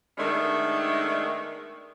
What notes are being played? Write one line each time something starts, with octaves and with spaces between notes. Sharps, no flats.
D#3 G#3 A3 B3 D4